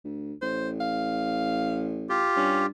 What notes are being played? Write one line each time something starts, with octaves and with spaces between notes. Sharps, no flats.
D2
A1 C5
F5
F4 G4
G2 C#4